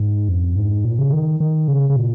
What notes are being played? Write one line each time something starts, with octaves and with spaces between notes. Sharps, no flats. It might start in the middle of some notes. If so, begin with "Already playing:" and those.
Already playing: G#2
F2
G#2
A#2
C#3
D#3
D#3
C#3
C#3
A#2